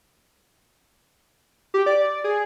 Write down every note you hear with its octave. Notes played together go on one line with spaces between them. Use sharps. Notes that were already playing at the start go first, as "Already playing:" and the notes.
G4
D5
G#4